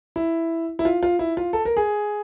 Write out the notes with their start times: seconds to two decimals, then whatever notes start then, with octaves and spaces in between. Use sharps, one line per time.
0.16 E4
0.79 E4
0.85 F4
1.03 F4
1.19 E4
1.37 F4
1.53 A4
1.65 A#4
1.77 G#4